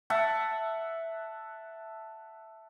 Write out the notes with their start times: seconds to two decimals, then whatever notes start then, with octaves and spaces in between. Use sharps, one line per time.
0.10 E5 F#5 A5